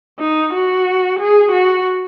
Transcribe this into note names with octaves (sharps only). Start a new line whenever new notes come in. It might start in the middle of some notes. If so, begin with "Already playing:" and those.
D#4
F#4
G#4
F#4